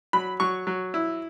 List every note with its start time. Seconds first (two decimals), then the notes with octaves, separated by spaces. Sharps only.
0.13 F#3 B5
0.40 F#3 C#6
0.67 F#3
0.94 E4